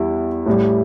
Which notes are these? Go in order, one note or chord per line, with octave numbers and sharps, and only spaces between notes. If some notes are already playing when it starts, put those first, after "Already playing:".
Already playing: E2 G3 E4
A2 G3